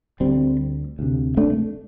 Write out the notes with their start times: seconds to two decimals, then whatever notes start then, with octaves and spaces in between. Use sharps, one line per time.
0.20 D2 D3 G3 C4
0.99 D2 C3
1.37 A3 D4